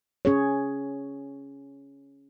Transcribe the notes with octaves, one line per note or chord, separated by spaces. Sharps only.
C#4 G#4 C#5